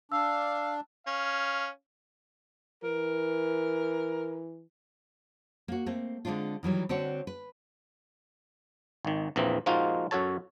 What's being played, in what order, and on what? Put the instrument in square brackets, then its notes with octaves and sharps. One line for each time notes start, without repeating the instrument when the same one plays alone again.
[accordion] D4 [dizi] F5 [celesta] E6
[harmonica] C#4 F5
[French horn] E3 [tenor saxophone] A#4
[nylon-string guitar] A#3 F#4
A3 A#3 C4
D3 G#3 C4 D4 F4
D#3 E3 F#3 G3
D3 C4 D4 F#4 C#5
B4
[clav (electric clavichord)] G#1 D#3
A#1 E2 E3 A#3 C4
F3 G#3 A#3 D#4 F4 F#4
F#2 F#4 A4 C#5 A5